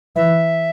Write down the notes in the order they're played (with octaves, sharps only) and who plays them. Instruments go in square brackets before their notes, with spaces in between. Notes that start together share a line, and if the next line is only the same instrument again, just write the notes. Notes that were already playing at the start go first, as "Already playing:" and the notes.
[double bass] E3 [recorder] E5